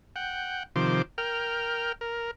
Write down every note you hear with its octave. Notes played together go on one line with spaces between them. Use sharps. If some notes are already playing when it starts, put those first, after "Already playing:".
F#5 G5
C3 D#3 F3 C5 D6
A#4 G5 F6
A#4